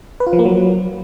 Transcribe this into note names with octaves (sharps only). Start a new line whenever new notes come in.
B4
F4
F3
A#3
F#3